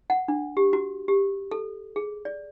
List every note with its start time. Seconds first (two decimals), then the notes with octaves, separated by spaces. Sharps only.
0.10 F#5
0.28 D4
0.57 G4
0.73 F#4
1.08 G4
1.51 A4
1.96 G#4
2.25 D5